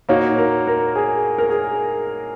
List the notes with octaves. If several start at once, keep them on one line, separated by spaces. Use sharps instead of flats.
A#2 A#3 D#4 F#4 C#5
A#4
A#4
G#4
A#4
G#4